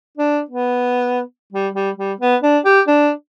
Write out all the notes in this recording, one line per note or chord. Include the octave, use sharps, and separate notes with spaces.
D4
B3
G3
G3
G3
B3
D4
G4
D4